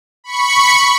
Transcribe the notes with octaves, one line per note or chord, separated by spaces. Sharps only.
B5 C#6 C#7